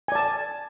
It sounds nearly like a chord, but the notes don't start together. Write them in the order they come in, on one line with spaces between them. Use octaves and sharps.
G#5 D5 A5